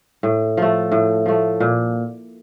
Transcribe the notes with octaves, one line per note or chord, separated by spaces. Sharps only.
A2
F3 A3
A2
F3 A3
A#2